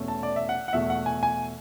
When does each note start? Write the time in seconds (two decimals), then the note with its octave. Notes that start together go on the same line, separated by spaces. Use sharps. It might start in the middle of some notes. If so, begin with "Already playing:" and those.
Already playing: E2 B2 A3 C#4
0.08 A5
0.23 D5
0.36 E5
0.49 F#5
0.68 F#5
0.73 E2 B2 A3 E5
0.90 F#5
1.06 G#5
1.23 G#5